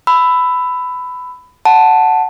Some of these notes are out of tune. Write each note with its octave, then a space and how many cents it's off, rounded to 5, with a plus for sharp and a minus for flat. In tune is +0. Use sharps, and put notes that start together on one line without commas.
B5 +15 E6 +0
F#5 +0 A5 +0